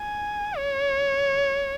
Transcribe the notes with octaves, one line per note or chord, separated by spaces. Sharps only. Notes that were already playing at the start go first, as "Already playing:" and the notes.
Already playing: G#5
C#5